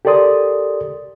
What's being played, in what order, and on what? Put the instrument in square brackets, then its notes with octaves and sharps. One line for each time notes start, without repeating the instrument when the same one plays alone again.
[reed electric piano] G4 A4 A#4 D5 C6 D#6